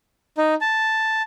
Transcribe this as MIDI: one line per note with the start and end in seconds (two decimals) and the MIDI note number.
0.38 0.55 63
0.61 1.22 81